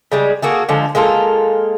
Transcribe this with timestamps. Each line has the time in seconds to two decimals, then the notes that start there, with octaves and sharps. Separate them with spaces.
0.12 C#3 G3 G#3
0.42 A#3 F#4 G#4 A4
0.69 D3 F3 G#3
0.95 G#3 A#3 F4 A4